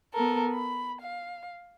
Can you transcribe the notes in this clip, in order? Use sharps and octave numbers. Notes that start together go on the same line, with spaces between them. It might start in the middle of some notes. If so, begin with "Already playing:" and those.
B3 A4 A#4
B5
F5